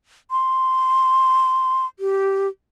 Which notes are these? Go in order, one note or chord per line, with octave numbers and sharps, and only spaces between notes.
C6
G4